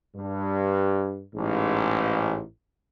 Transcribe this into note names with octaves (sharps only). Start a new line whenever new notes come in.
G2
A1 G#2